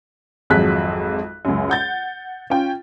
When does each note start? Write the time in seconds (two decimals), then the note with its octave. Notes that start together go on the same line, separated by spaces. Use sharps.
0.50 G#1 F2 F#3 G#3 F#6 B6
1.45 C#2 F#2
1.70 F#5 G6 A6
2.50 C#4 F4 G5